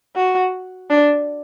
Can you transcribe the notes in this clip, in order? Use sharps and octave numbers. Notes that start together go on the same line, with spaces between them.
F#4
D4